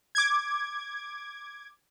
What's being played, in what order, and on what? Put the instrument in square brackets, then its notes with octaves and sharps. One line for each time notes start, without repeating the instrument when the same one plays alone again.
[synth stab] D6 G#6